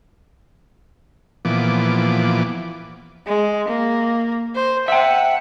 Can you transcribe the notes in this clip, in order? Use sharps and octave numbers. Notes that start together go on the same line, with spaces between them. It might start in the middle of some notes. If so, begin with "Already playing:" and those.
A#2 E3 F3 B3 D6
G#3
A#3
C5
E5 F#5 G5